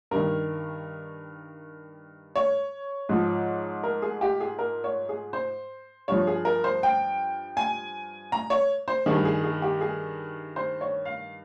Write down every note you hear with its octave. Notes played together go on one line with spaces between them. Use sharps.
G2 D#3 A#4
C#5
G#2 F3
A#4
G#4
G4
G#4
A#4
C#5
G#4
C5
G2 F3 C#5
G#4
A#4
C5
G5
G#5
A#5
C#5
C5
G2 D#3 G#4
G#4
G#4
G4
G#4
C5
C#5
F5